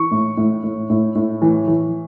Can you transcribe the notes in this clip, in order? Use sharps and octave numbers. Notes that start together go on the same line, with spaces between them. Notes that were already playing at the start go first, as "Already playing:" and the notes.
Already playing: E3 C#6
A2
A2
A2
A2
A2
E3
E3